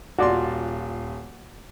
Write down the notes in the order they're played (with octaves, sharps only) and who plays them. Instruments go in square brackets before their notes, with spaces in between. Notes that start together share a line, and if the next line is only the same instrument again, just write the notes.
[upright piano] D#1 F4 C6 [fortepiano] F#4 D5